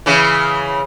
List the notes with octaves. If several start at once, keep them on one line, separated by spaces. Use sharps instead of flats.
C#3 E3